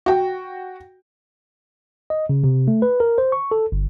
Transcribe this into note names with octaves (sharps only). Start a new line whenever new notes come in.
F#4 G5
D#5
C#3
C3
A3
B4
A#4
C5
C#6
A4
G1